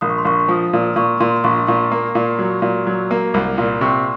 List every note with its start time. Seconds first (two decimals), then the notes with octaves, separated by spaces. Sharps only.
0.01 A#1 D#6
0.10 C#6
0.18 C6
0.25 A#1 C#6
0.39 C#6
0.48 F3 D#6
0.73 A#2
0.96 A#2 C#6
1.20 A#2 C6
1.36 C6
1.44 A#1 C#6
1.67 A#2 C#6
1.92 A#3
2.15 A#2
2.39 F#3
2.62 A#2
2.87 F#3
3.11 A#3
3.34 C2
3.58 A#2
3.81 C3 C#6